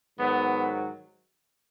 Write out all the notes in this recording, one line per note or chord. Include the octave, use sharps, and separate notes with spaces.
G#2 D#3 F#3 B3